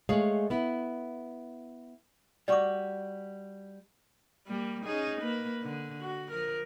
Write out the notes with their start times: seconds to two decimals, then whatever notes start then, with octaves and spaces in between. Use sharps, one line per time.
0.09 G#3 A3 G#4 C#5 F5
0.50 B3 E4
2.48 G3 F#4 D5 C#6 D6
4.47 G3 A#3
4.84 C#4 D#4 G#4
5.20 A#3 B4
5.62 D3
6.00 F#4
6.31 F3 A#4